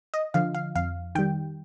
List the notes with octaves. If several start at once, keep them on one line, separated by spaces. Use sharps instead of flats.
D#5
D3 F3 F5
F5
F2 F5
D#3 G3 G5